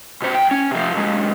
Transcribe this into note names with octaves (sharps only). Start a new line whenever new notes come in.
B2 C5
B1 G5
C#4
C3 F3
B1 G#3